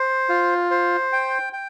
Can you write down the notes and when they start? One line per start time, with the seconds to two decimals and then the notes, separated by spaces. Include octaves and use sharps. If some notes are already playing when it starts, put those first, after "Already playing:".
Already playing: C5
0.29 F4
0.71 C5
1.12 G5
1.53 G5